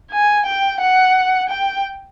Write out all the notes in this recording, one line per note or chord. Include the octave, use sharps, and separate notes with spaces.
G#5
G5
F#5
G5